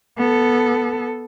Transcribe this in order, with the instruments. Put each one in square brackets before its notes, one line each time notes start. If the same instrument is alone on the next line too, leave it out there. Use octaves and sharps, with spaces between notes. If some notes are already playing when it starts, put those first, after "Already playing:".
[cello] B3 A4